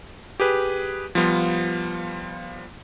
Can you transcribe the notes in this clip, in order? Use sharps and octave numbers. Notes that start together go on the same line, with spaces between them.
G4 G#4 B4
F3 G3 B3 F4